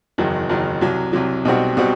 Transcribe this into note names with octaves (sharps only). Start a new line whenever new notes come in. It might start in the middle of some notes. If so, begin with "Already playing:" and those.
F#1 E2 D#3 F#3
F#1 E2 D#3 F#3
C2 C3 F#3
C2 C3 F#3
B1 B2 G3 C4 F#4
B2 G3 C4 F#4